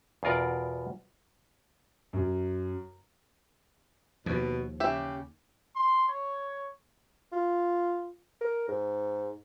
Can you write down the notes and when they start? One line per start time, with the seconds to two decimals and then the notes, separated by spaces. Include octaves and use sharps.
0.23 E2 B2 F4 A#4 D5
2.13 F#2
4.26 D#2 B2 F3
4.80 C#3 G4 E5
5.76 C6
6.09 C#5
7.32 F4
8.41 A#4
8.68 G#2